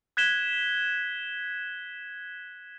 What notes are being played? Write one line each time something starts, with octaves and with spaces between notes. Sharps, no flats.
F#6 G#6 B6 E7 G7